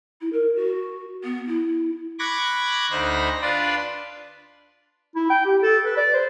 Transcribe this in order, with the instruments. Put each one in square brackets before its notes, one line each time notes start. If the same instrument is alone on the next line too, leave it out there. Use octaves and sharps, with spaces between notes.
[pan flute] E4
A#4
F#4
B3
E4
[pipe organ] B5 C#6 D6 F#6 G#6 A#6
D2 D#4 C5 B5 A#6
D4 F4 B4 D5 C6
[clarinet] E4
G5
G4
A4
B4
D5
C5